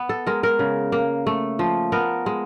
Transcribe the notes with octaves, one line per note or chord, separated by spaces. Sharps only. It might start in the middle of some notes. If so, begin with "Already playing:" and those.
Already playing: B3
A4
G#3 A#4
A#4
C#3
A#3
A3
F3
B3 A#4
G#3